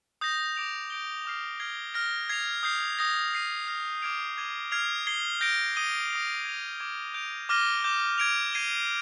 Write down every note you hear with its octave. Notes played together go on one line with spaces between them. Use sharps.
D#6 G6 A#6
D6 G6 D7 F7
G6 D7 G7
D6 F6 C7
F6 G#6 C7 G7
F6 A#6 D7
G#6 C7 F7
D#6 G6 C7
D#6 G6 A#6 F7
G#6 C7 D#7
F6 A#6 F7
D6 F6 G#6 D7 F7
D6 G#6 D#7 G7
F6 G#6 C7 F7
G#6 C7 G7
G6 A#6 D7
D#6 A#6 D#7 G7
D#6 A#6 F7
G#6 C7 F7
D6 G#6 D7
G6 D7 F7
D6 F6 A#6 D#7 G7
D6 G6 A#6
G#6 D7 F7
G#6 C7 D#7 G7